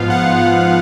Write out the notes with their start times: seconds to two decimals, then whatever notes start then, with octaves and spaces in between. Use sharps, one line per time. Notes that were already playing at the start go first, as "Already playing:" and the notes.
Already playing: G#2 F3 B3 F4 F5
0.10 G#2 F#5
0.31 F3 B3 F4
0.52 G#2